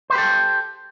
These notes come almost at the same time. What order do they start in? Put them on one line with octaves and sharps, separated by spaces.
C5 B4 G4 A4